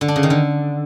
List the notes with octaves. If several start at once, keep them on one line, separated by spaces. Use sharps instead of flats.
D3
D4
C#3
D#3
D3